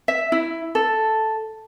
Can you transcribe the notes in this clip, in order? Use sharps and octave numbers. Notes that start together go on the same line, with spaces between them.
E5
E4
A4